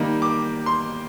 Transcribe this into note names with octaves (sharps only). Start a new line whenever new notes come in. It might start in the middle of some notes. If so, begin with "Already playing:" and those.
Already playing: D#3 G3 A#3 D#4
D6
C6